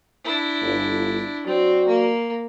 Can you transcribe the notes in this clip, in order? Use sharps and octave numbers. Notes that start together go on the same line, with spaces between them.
D4 E4
G1
F#3 C4 F#4 D5
A#3